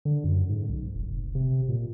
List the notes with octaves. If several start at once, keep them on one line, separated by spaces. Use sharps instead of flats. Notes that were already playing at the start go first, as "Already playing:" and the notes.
D3
F#2
G#2
B1
F1
F1
C3
A#2